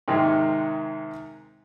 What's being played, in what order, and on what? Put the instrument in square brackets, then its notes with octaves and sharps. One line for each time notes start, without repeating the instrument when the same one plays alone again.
[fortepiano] G#2 C3 D#3 G#3